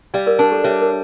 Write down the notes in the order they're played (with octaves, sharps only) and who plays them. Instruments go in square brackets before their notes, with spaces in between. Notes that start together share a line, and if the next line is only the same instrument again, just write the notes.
[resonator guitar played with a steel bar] G3 [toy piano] D5 F5
[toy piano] A#4 D5
[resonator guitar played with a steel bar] D4 [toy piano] A#4
[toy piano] A4
[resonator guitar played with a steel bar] G3 [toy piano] C#5 E5
[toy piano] A#4